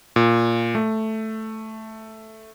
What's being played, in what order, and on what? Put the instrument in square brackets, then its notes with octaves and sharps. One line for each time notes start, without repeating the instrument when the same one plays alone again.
[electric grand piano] A#2
A3